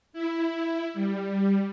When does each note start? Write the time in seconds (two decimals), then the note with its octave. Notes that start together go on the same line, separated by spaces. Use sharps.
0.13 E4
0.94 G3